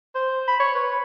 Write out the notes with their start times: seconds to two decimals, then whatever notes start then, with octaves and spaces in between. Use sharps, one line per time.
0.15 C5
0.48 B5
0.60 C#5
0.74 B4